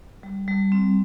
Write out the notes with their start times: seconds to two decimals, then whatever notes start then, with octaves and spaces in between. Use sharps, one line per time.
0.23 G3
0.48 G3
0.72 C4